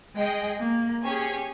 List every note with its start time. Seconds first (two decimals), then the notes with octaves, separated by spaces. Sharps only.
0.16 G#3 G#4 D#5 G5
0.59 A#3
1.03 C#4 G4 G#4 C#5 G#5